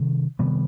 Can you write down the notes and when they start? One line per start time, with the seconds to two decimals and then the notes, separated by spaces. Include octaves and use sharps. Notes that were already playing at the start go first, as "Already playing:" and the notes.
Already playing: C3 D#3 G3
0.39 C3 D#3 G3 B3